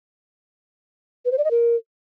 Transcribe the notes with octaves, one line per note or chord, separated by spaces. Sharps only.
B4
C5
D5
D#5
A#4